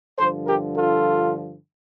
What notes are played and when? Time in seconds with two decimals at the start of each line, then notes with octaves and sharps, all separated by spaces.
0.18 G2 D3 F3 A4 C5
0.46 G4 A#4
0.75 F4 A4